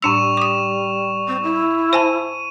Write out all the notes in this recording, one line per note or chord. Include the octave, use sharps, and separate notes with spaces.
A2 G3 D4 C#6 E6 E7 F7
D6 D#6
C4
E4
C5 G#5 A5 D#7